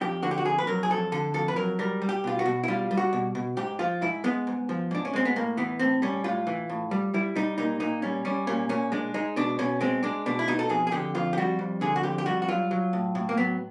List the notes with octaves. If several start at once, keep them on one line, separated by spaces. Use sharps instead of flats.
F2 G4
D3 F#4
G4
F#4
F2 G#4
B4
F#3 A#4
G#4
F2 A4
D3 A4
F2 A4
B4
F#3 A#4
G3 A#4
G3
G4
B2 F4
F#4
B2
E4
G3 F4
G3
F#4
B2
B2
G#2 G4
F3 F4
G#2 E4
G#3 B3
G#2
F3
G#2 D4
C#4
G#3 C4
B3
A2 A#3
E3 B3
A2 C4
G3 C#4
A2 F4
E3
A2
G3
G3 E4
G3 D#4
A#2 D#4
A#2 D#4
G3 C#4
G3 C#4
A#2 C#4
A#2 C#4
G#3 D4
G#3 D#4
B2 D4
B2 C#4
G#3 C4
G#3 D4
B2 D4
E4
B2 D#4
A4
F2 G#4
G#4
D3 G4
F2 F4
G4
G3 F#4
F2
D3 G#4
F#4
F2 G4
G4
G3 F#4
F#4
F#3 F4
F#3
A2
A2
A#3
F#3 B3